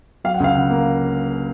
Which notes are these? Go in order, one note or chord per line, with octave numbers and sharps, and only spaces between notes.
F#3 F5
F#5
C#2 F5
C#3 F#5
A#3